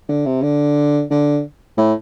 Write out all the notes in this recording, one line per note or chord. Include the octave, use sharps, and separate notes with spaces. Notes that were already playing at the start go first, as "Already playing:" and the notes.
D3
C3
D3
D3
A2